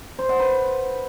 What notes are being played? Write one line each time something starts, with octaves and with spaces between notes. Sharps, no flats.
C5
F#5
B4